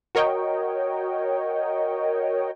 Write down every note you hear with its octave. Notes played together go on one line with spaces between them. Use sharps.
F#4 A#4 C#5 D#5 G5